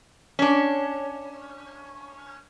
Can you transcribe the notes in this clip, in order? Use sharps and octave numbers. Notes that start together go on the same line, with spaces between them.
C#4 D4